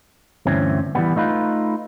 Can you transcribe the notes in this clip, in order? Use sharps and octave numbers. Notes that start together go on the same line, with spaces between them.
D2 G2 E3 C4 C#4
E3 G3 B3
A3 D#4 F4 B4